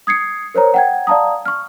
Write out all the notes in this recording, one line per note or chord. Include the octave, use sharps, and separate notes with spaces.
D#6 G#6 C7 C#7
A#4 C5 C#5 A#5
F#5 G5 G#6
D5 F5 A5 A#5 D#6
C#6 F6